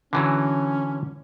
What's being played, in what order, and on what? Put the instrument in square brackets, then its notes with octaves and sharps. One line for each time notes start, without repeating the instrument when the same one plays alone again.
[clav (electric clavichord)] D3 E3 F#3 [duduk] C#4